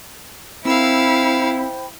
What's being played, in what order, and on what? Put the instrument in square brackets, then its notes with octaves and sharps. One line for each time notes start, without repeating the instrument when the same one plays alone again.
[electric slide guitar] C4 A#4 [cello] E4 [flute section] C5 G5 B5 [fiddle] F5 E6